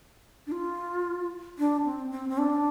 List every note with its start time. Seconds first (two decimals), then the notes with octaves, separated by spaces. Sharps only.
0.47 D4
0.52 F4
1.59 D4
1.85 C4
2.12 C4
2.29 C4
2.38 D4